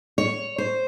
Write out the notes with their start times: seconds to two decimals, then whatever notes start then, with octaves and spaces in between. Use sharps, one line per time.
0.18 C#5
0.58 C5